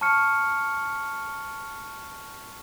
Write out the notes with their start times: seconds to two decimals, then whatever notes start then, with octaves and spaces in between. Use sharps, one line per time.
0.01 A5 C#6 F6 C#7